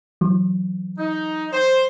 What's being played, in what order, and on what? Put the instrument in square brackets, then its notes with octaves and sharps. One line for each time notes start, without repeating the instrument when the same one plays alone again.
[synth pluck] E3 F#3
[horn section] D#4
C5